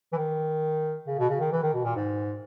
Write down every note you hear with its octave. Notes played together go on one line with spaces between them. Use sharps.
E3
D#3
C#3
B2
C#3
D#3
E3
D#3
B2
A#2
G#2